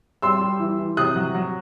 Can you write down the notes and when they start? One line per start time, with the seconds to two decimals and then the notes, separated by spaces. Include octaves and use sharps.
0.22 G3 C6 E6
0.41 G3
0.60 E3
0.79 E3
0.97 C3 D#6 F#6
1.16 F#3
1.35 F#3